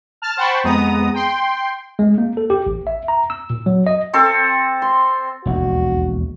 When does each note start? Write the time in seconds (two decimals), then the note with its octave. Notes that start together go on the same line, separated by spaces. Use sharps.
0.22 A5 F6
0.37 C5 F#5 G5 A5 B5 C#6
0.64 F2 G#3 B3 A#5 D#6
1.14 G5 C6
1.99 G#3
2.18 A#3
2.37 A4
2.50 G4
2.67 A1
2.87 E5
3.08 A#5
3.30 E6
3.50 A#2
3.66 F#3
3.87 D#5
4.13 C4 A4
4.82 C6
5.46 E1 A#1 D#2 F#4